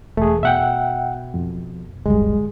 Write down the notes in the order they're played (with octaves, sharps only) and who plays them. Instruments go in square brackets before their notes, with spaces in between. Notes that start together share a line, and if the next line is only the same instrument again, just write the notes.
[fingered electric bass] E1 [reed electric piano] A3 G#4
[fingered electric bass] B2 [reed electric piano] E5 F#5 G5
[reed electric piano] F2
[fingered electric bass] D1 G1 G3 [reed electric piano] G#3